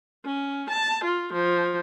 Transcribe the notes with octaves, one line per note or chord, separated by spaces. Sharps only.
C#4
A5
F4
F3